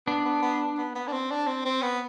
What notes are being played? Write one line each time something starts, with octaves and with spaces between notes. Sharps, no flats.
B3 D4
B3
B3
B3
B3
D4
C4
D4
C4
C4
B3